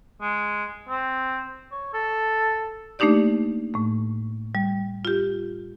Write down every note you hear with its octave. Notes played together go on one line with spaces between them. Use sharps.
G#3
C4
C#5
A4
A3 A#3 D4 D#4 G4 D5
A2 A3
G3
F4 G4